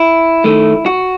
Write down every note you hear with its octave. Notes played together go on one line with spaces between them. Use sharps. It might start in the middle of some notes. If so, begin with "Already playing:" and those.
Already playing: E4
D#3 A3
F#4